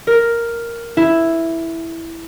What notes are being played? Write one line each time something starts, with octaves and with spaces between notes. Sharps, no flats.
A#4
E4